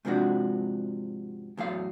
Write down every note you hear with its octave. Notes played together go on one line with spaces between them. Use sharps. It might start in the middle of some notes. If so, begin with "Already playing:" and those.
G#2 C3 F3 D4 F#4
E2 A2 F#3 F5